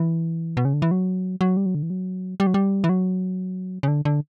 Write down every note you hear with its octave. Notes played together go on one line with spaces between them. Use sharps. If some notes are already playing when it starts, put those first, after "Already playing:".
Already playing: E3
B2
C#3
D3
E3
F#3
F#3
G3
F#3
D3
E3
F#3
G3
F#3
G3
E3
F#3
C#3
D3
D3